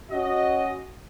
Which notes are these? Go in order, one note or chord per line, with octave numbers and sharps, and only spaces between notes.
C#4 F#4 D#5